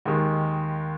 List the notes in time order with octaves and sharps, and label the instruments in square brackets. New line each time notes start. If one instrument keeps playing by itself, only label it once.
[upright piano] D#2 D#3 G#3